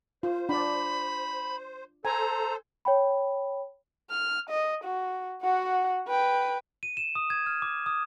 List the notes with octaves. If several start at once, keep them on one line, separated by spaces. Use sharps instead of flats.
F4 C5
D4 D5 B5
A4 C5 G#5 A#5
C#5 G5 B5
F6
D#5
F#4
F#4 F#5
B4 G5
D#7
E7
D#6
G#6
F6
D6
D#6